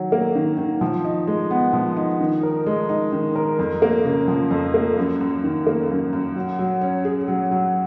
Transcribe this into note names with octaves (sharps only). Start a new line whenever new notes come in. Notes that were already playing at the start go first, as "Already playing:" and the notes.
Already playing: D#3 F#3
A#3
D#3
D#3
F3
D#4
G#3
B3
F3
D#4
D#3
A#4
G#3
D#4
D#3
A#4
F2
A#3
C#3
F3
F2
A#3
F#2
F#2
D#3
A#3
F#2
F#2
F#3
F#3
C#4
G#4
F#3
F#3